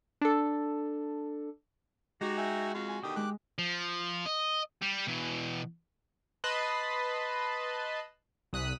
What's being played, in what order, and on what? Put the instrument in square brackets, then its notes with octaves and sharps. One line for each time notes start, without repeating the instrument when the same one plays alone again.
[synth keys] D4 A4
[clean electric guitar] G#3 [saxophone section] D#4 F#4 [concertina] G4
[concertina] E5 G5 G#5
[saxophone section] F2 F4 F#4
[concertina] G#5
[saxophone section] B2 D3 D#3 [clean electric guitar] G4 [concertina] D#6
[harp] G#3 [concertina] D6 F#6
[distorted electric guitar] F3
D#5
G3
B2 E3
[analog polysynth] B4 D#5 A5 B5 C6
C2 D#6 F#6 B6